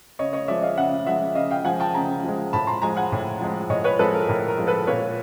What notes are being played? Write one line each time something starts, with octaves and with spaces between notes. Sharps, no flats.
C#3 C#5 D#5
C#5 D#5
F3 G#3 D5 E5
D#5 F5
C#3 E5 F#5
F3 G#3 E5 F#5
C#3 D#5 F5
F5 G5
F3 G#3 F#5 G#5
G5 A5
C#3 G#5 A#5
F3 G#3
A2 A5 B5
A#5 C6
F3 G#3 G#5 A#5
F#5 G#5
A2
F3 G#3
A2 C#5 D#5
B4 C#5
F3 G#3 A4 B4
A#4
A2 A#4
A#4
F3 G#3
A4 B4
A#2 B4 C#5